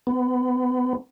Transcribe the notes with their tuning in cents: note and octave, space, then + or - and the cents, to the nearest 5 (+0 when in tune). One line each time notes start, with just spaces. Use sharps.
B3 +30